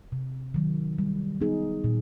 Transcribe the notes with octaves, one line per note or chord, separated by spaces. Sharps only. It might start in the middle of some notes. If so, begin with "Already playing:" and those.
C3
D#3 F#3
G3
B3 D#4 G#4
A#2